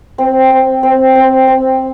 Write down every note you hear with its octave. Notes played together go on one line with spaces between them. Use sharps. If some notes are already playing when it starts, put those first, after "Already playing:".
C4
C4
C4
C4
C4